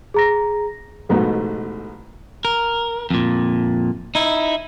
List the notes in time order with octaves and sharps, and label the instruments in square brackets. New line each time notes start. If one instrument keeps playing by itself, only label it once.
[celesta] G#4 A#5 A#6
[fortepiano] A1 G#2 B2 A3 B3
[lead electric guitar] A#4
F2 A#2
D#4 E4